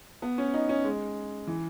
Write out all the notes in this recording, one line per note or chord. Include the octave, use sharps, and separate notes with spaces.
B3
C#4
D#4
C#4
G#3
E3